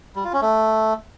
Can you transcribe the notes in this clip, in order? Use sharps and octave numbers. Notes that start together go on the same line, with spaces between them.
G3
F4
C#4
A3